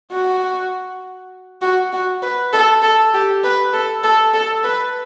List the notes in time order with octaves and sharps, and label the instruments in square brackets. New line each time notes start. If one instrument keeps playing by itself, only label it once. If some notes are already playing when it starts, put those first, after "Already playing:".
[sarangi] F#4
F#4
F#4
B4
A4
A4
G4
B4
A4
A4
A4
B4